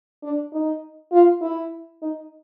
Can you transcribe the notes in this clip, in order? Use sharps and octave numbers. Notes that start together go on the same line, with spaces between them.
D4
D#4
F4
E4
D#4